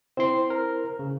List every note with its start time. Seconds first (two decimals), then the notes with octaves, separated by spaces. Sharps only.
0.17 C4 E4 C5 C6
0.50 A#4
0.99 C#3